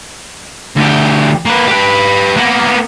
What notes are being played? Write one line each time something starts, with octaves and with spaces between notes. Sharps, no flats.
D2 G4
A#3 B4
G4 B4
A#3 B3